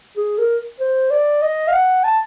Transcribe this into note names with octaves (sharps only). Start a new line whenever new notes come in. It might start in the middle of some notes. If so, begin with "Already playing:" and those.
G#4
A#4
C5
D5
D#5
F5
F#5
A5